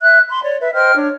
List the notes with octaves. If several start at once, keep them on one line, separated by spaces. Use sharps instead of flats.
E5 F#6
B5 C6
C#5 D5
B4 E5
C5 D#5 G5 F6
D4 C#5